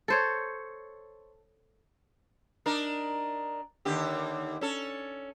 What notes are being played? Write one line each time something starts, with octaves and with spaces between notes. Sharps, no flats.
A4 C5 C#5
D4 D#4 A#4
D#2 D3 G4
C#4 A4